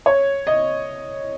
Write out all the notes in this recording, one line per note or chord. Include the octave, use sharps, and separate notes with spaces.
C#5
D#5